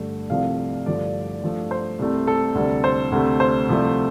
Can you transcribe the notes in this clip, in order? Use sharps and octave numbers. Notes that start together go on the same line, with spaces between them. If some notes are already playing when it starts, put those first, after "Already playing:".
Already playing: G2 D3 A3
C2 C3 F3 A3 F5
G2 D3 F3 A3 D5
G2 F3 A3
C5
C2 C3 A3
A4
D2 C3 G3
C5
D2 C3 A3
C5
C2 C3 F3 A3